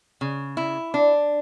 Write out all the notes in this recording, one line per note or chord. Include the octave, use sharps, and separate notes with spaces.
C#3
E4
D4